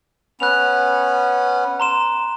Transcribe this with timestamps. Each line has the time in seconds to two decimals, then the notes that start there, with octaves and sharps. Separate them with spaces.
0.40 B3 C#4 F#6 F7
1.80 A#5 C6 E7